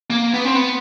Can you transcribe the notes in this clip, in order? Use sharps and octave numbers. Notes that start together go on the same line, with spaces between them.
A#3
B3
C4
B3